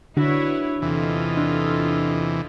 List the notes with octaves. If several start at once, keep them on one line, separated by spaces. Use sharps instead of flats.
D3 D4 E4 F#4 B4 C#5
E2 C3 E3 F4 A4 D#5
D4